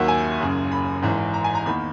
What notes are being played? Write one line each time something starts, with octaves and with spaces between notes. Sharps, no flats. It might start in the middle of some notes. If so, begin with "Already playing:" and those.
Already playing: D#2 D#3 F#3 A#3 E5 F#5
G#5
F#1 F#2 C#3
B5
G#1 G#2 E3
A#5
G#5
A#5
E2 D#3 A#3 B5